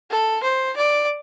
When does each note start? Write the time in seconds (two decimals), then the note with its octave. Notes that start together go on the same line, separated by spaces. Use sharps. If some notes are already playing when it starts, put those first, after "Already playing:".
0.10 A4
0.43 C5
0.76 D5